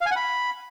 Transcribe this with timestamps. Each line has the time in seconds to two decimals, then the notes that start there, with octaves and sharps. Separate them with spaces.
0.01 F5
0.06 G#5
0.11 F#5
0.16 B5